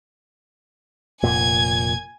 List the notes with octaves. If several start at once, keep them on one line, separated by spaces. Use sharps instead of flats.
F1 A#2 G#5 G#6